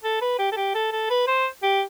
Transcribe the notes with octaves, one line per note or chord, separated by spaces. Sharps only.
A4
B4
G4
A4
G4
A4
A4
B4
C5
G4